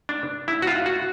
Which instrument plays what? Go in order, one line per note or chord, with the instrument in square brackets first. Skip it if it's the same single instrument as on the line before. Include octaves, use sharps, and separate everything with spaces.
[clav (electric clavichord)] D4
E4
F#4
F4
F#4